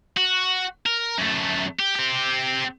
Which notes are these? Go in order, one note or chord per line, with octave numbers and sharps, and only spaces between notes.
F#4
A#4
F#2 A3
G4
C4 G4